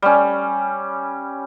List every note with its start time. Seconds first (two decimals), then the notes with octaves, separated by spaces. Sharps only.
0.02 G3 C#4